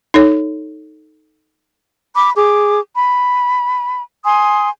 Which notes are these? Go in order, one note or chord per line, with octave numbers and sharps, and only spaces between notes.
D#4 A4 C#5
B5 D6
G#4 D6
B5
G#5 C6 D#6